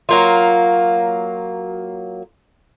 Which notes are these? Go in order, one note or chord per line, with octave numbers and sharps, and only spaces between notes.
F#3 A#3 F4